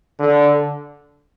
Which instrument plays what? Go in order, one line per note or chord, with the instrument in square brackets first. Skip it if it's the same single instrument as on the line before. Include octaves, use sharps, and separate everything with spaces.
[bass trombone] D3